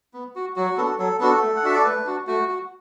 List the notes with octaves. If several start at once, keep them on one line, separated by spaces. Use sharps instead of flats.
B3
F#4
F#3 F#4
B3 D4 F#4 A4
F#3 A4
B3 D4 F#4 A4
A3
F#5
D4 F#4 E5
D5
A3 B4
D4 F#4
A3 F#4
F#4